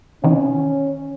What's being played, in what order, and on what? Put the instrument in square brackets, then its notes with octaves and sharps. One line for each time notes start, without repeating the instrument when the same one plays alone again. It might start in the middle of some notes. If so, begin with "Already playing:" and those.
[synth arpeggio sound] C3 D#3 E3 [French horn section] C#4